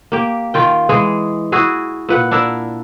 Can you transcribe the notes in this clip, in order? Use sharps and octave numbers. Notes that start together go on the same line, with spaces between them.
A#3 G4
D#3 F4 G5
E3 G#3 G#4
E4 F#4 G#4
A#2 B4 F#5
D4 E4 A#4 E5